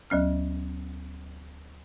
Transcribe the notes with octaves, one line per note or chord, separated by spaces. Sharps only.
D2 F#3 C#4 F6